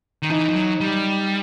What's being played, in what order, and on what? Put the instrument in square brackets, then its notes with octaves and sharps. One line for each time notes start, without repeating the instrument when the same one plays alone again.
[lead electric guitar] D#3
[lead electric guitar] E3 [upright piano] D#4
[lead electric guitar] F3
F#3
G3